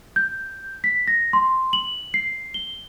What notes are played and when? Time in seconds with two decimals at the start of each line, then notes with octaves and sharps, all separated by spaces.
0.16 G6
0.84 B6
1.08 A#6
1.33 C6
1.73 F#7
2.14 C7
2.54 G7